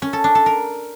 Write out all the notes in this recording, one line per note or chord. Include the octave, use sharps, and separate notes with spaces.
C#4
A4
D4
A4
A#4